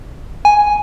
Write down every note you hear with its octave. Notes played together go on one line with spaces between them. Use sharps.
G#5